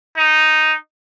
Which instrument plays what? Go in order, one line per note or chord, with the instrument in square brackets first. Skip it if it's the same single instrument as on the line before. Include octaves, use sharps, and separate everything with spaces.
[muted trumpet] D#4